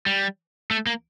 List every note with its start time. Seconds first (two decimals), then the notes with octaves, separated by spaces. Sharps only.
0.06 G3
0.71 A3
0.86 A#3